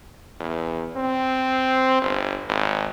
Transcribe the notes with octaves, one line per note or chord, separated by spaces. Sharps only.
E2
C4
G1
G#1